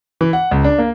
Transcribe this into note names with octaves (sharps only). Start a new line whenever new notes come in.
E3
F#5
C#2
D4
A#3